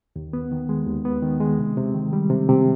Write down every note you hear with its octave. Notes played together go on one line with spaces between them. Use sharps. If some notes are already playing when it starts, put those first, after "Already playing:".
D#2
B3
D#3
G#3
D#2
B3
D#3
G#3
C3
C3
D#3
G3
C3
C3